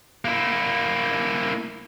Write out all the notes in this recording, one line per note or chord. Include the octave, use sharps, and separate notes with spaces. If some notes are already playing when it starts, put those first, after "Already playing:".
A#3 E4